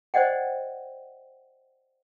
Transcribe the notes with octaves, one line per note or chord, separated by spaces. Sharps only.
C5 D5 D#5 F#5 G5